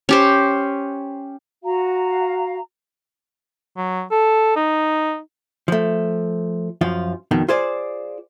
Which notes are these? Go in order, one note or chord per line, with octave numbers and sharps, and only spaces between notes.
C#4 G4 C5
F#4 F5 A#5
F#3
A4
D#4
F3 A3
F#2 F3 F4
F2 B2 D#3
F4 G#4 C5 D5